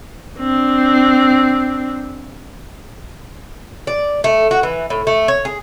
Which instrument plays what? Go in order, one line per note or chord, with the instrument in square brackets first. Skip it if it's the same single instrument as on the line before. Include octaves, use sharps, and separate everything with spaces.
[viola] C4 D4
[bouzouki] D5
A3
F#4
E3
A2
A3
C#5
G#4